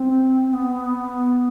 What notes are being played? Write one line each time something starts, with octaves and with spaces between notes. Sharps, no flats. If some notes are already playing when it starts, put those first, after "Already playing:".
Already playing: C4
B3